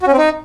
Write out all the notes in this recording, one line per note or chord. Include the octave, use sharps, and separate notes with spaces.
F#4
C#4
C4
D#4